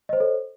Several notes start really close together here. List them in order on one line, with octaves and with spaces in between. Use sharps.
D#5 C5 C#5 A4